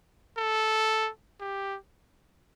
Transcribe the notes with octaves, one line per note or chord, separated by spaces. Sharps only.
A4
G4